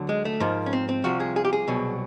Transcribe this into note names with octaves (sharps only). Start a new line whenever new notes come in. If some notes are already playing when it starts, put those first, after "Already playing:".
Already playing: D2 D3 F#3
G#3
A3
G#2 F3 A#3
C#4
C4
C4
C2 C3 F3 F#4
G#4
G#4
G4
G#4
C2 B2 F#3